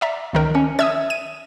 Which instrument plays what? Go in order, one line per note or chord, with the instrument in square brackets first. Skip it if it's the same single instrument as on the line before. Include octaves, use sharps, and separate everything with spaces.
[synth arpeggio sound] D5 E5 A#5
C#2 D#3 A#4
[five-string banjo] C#4
[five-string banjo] E5 [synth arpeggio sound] D#6 E6 G#6
[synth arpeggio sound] D#7